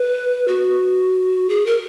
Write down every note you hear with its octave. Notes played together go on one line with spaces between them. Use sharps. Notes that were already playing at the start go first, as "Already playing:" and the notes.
Already playing: B4
F#4
G#4
A#4